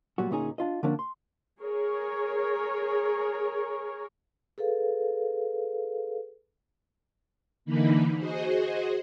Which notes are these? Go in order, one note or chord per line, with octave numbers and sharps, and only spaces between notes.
A#2 F#3 G3 F#4
D2 A#2 C#4 D#4 G#4
D4 F4 D#5
D3 F3 A#3 C#4 D4
C6
G#4 A#4 C#5
G#4 A4 B4 F5
D3 E3 A#3 D#4 B5
F#4 G#4 C5 D#5